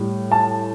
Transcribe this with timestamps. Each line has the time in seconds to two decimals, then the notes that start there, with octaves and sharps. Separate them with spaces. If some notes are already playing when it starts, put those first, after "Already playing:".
Already playing: A2 G3
0.32 A5